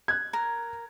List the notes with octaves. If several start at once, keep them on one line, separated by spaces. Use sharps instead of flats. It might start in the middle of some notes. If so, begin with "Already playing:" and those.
F#6 G#6
A#4